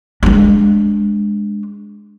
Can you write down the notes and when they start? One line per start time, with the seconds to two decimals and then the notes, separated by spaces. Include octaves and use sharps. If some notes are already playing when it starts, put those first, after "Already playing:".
0.23 G#3 D4